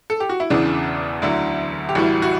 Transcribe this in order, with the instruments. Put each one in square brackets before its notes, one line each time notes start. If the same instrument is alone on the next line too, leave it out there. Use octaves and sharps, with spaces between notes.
[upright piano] A4
G4
F#4
E4
E1 E2 C#3 E3 D4
D2 D3 F#3 E4
G4
A1 A2 E3 G3 F#4
F#4